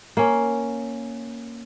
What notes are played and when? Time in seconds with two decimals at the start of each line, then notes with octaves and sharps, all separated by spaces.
0.17 A#3 C#4